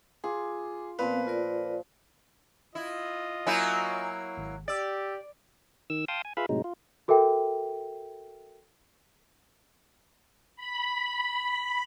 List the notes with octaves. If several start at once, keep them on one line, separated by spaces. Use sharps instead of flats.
F4 G#4 D6
A#2 F3 B3 C4 B4 F5
F4 A#4 D5
E4 F4 D#5
F#3 A#3 E4 G#5 A#5 G6
G#1
G4 D5 E6 A6
D#3 E6
F5 G5 A5 C6 D#6
G#5
F4 G#4 B4 E5 F5 B5
A2 C3 F#3 G#3 D#4
F4
F#4 A4 A#4 E5 G5
B5